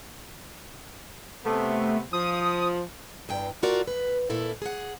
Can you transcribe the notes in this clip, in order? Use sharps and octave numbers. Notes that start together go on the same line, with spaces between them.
C3 A3 B3
F3 D#6
E2 G2 G5
A3 F4 F#4 A#4 D5
B4
A#2 A3 E4 A4
G#4 F#5